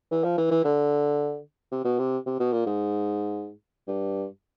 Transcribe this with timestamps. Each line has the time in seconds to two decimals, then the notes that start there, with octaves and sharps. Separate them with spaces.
0.11 E3
0.24 F3
0.37 E3
0.51 E3
0.64 D3
1.72 C3
1.85 B2
1.99 C3
2.26 C3
2.40 B2
2.52 A#2
2.66 G#2
3.87 G2